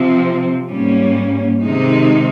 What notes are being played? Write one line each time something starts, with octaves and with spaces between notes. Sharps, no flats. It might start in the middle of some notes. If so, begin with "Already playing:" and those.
Already playing: C3 F3 C4
G#2 G3 A#3 C#4
C3 D#3 G#3 D#4